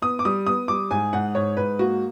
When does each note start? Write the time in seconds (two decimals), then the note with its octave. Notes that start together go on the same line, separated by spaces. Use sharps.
0.02 B3 D#6
0.19 D6
0.25 G3 D#6
0.47 B3 D#6
0.68 G3 D6
0.91 G#2 G#5
1.13 G#2 F#5
1.35 G#2 C#5
1.57 G#2 B4
1.79 A#3 F#4